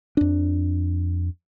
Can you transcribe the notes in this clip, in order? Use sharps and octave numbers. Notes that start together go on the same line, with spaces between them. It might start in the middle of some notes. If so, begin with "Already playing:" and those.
F2 D4